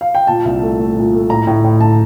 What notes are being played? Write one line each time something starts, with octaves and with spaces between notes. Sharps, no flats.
F5
G5
A#2 A5
C2
A3
A3
A#2
A3
A2 A#5
A2
A2
A2 A5